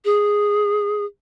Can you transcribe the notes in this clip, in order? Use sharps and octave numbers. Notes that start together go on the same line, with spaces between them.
G#4